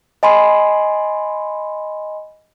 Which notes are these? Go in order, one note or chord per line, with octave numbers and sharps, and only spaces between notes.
D#5 G#5 B5 C6